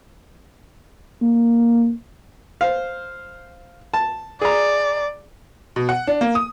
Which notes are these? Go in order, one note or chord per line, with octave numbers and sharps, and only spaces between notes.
A#3
C5 F5
A5
G#4 D5 A#5
B2
F#5
D4
A#3
D#6